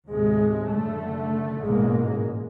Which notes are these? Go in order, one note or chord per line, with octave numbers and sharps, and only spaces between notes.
D#2 A2 C3 G#3
F#1 D3 A3
A1 G#2 B2 G#3 A#3